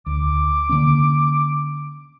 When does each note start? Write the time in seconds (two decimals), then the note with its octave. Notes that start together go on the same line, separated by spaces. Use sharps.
0.06 D2 D6
0.69 D3 A#3 C#4